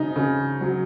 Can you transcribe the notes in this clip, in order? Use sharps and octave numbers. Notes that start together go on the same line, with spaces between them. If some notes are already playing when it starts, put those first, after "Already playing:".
Already playing: C#3 D#4
C#3
F#3